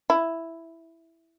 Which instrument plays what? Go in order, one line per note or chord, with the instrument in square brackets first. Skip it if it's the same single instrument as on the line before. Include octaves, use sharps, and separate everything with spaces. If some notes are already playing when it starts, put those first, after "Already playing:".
[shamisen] E4